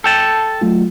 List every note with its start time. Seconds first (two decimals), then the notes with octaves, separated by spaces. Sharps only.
0.04 A4 G5 A5
0.61 F#3 A3 F4